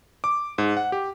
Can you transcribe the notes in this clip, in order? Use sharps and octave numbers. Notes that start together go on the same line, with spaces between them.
D6
G#2
F#5
G4